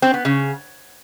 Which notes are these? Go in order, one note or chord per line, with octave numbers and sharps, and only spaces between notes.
C4
B3
C#3